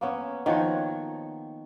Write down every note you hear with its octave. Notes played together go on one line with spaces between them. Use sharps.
A#3 B3 C#4
D#3 F3 F#4 C#5